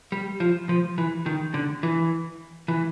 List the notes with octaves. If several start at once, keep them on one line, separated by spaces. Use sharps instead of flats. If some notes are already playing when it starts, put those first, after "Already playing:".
G3
F3
F3
E3
D#3
D3
E3
E3